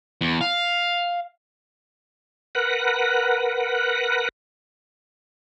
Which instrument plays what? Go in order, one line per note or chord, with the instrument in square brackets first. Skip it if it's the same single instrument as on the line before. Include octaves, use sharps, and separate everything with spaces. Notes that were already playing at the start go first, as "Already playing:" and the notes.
[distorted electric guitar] E2
F5
[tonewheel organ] A#4 B4 F#5